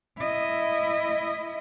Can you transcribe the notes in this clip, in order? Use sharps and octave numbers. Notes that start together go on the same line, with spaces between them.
E4 D#5